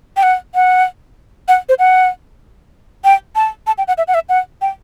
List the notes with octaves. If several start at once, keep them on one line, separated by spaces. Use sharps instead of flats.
G5
F#5
F#5
F#5
C5
F#5
G5
A5
A5
G5
F#5
E5
F#5
E5
F#5
G5